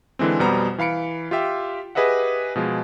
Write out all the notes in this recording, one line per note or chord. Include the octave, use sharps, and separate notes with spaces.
D3 E3 G#3 C4
F2 B2 G3 B3 C5 A#5
E3 F5 B5 C#7 D7
F4 G4 E5 G5
G4 G#4 B4 D#5 E5 F#5
B2 F3 G#3